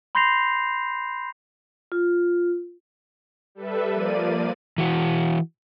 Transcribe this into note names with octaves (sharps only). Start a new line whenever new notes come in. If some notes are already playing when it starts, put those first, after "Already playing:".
B5 C6 G6 A#6 C7 F7
F4
G3 A4 B4 E5
F3 A#3 D5 D#7
E3 F#4